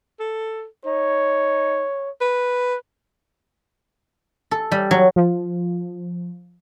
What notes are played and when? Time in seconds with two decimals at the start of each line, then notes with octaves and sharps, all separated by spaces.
0.20 A4
0.86 D#4 C#5
2.21 B4
4.51 A4
4.72 G3
4.91 F#3
5.16 F3